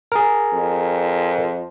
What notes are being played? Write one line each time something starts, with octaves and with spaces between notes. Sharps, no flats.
G#4 A#4
F2